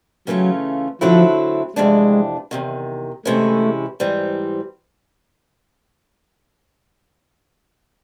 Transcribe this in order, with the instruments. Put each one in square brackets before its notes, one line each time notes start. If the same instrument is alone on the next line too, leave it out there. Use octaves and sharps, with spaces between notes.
[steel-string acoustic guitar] C#3 E3 A3 C#4 F4 [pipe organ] F#3
[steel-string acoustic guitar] D3 F#3 A3 C4 E4 [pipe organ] F3
[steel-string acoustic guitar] F2 C3 E3 A3 D4 [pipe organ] G#3
[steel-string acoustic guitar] E2 C3 D#3
[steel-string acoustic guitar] C3 E3 G#3 C#4 E4 [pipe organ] A3
[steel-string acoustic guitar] G#2 E3 G3 C4